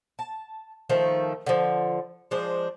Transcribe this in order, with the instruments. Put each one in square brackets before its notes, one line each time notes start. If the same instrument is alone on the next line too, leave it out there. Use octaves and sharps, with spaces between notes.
[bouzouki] A5
D#3 F3 A3
D3 F3
F3 G#3 D4 C5